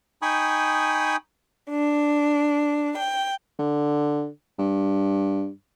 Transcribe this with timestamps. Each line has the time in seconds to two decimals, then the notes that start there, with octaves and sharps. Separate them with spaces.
0.22 D#4 G5 G#5 B5 C#6 D#6
1.70 D4
2.98 G5
3.59 D3
4.59 G2